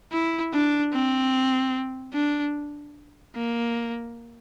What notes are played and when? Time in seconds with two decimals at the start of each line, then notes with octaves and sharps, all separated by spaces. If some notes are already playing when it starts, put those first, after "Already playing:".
0.12 E4
0.53 D4
0.93 C4
2.13 D4
3.35 A#3